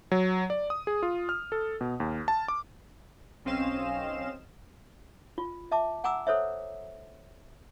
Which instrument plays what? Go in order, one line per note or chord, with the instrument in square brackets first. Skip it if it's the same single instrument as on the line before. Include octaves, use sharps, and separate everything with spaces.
[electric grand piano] F#3
D5
D#6
G#4
F4
F6
A4
B2
D#2
A5
D6
[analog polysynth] B1 C4 C#4 D#5 F5 E7
[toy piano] F4
E5 A5 D6
F#5 G#5 A#5 D6 E6
A4 C5 C#5 E5